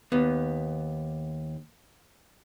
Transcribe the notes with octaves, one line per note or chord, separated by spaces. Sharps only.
D#2 B3